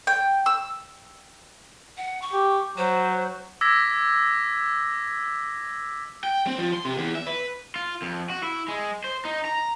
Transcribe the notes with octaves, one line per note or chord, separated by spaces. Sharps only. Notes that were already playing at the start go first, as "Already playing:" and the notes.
G5
E6
F#5
C#6
G4
F#3 C5
D6 E6 G#6 A#6 B6
G5
C4
F3
C6
C3
E2
E5
B4
F4
F2
F#4
E4
G#3
C5
D#4
A#5